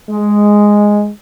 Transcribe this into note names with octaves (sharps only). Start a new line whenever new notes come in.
G#3